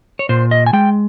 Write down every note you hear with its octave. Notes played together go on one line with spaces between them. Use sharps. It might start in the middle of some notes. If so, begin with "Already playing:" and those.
C#5
A#2 C5
D#5
G#5
G#3 G5